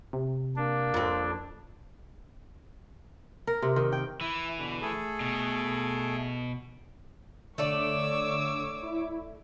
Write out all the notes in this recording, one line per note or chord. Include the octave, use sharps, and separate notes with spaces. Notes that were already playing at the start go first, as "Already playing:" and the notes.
C3
A#3 D4
F2 C4
A#4
C3
D#3
G5
E3 E4 E6
B2 D3
A3 G#4 A4
B2
D3 A3 A4 C#5 D5 D6 E6
E4